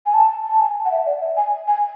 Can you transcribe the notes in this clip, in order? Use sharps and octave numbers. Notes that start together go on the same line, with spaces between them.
G#5
A5
A5
G#5
F#5
E5
D5
E5
G#5
G#5